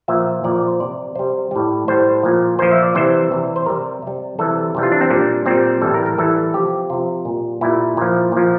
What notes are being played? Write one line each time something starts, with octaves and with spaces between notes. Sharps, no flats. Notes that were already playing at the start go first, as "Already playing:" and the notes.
A#2 F3 E5
A#2 F3 D5
D5
C5
C3 G3 D5
C3 G3 C5
A2 G3 D5
A2 G3 C5
A#2 F3
A#2 F3 C5
E5
D5
C3 E3 G3 C5
C3 E3 G3
C5
C3 G3 A#4
C3 G3
C3 E3 G3 A4
C3 E3 G3
F4
D4
C4
A#2 G3 D4
A#2 G3 C4
A2 E3 G3 A4
A#4
A#4
A2 E3 G3 A4
C3 F3 G4
C3 F3 F4
A#2 G3
A#2 G3 E4
A#2 F3
A#2 F3